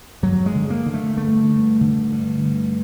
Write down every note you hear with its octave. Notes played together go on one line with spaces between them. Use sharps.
G2 F#3
G#3
D3
A#3
D3
A3
G2 A3
G2
D3
G2